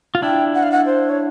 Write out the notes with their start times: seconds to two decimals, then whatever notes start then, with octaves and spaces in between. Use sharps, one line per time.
0.15 F4
0.22 D4 E4 G5
0.54 F#5
0.63 F5
0.72 F#5
0.86 C5
1.09 C#5